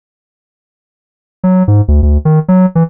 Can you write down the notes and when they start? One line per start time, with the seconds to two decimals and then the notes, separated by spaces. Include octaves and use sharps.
1.44 F#3
1.68 G#2
1.88 D2
2.03 D2
2.25 D#3
2.48 F#3
2.75 E3